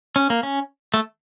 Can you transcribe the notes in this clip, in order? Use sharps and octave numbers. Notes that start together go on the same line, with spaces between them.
C#4
A#3
C#4
A3